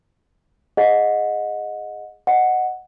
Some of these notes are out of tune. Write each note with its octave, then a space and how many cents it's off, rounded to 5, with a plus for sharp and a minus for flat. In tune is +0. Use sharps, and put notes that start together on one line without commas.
G#4 +0 D#5 +0 F#5 -25
D#5 -10 F#5 +0